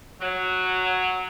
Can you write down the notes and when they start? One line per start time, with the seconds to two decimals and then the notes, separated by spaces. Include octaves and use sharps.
0.20 F#3